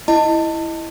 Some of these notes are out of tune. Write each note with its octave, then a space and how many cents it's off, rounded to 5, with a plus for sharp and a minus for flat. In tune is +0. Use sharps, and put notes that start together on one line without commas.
E4 +0 D#5 +0 A5 +30